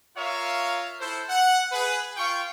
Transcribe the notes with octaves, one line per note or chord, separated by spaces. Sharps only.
F4 A#4 C#5 E5 F5
E4 A4 C5
F#5
G#4 B4
F4 F5 G5 C#6